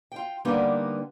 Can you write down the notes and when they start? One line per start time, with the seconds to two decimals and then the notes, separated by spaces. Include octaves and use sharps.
0.12 F4 G5
0.45 D3 G3 A#3 B3 D4 D#4